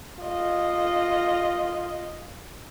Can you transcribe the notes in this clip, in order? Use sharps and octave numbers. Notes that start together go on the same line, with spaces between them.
F4 D#5